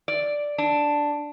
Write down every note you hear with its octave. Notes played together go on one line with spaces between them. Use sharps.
D5
D4